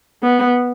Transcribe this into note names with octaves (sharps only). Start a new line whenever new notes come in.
B3